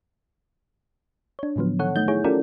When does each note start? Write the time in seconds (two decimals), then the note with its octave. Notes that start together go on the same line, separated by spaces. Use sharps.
1.39 D4 C#5
1.56 A2 D3 F3 F#3 B3
1.79 D#3 A4 C#5 F#5
1.96 A3 D#4 G6
2.08 E4 G#4 C#5
2.24 C#4 F4 G4 A4 A#4 D5